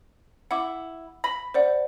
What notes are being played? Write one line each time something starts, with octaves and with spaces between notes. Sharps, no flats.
E4 F#5 D6
B5 A#6
C5 D5 F#5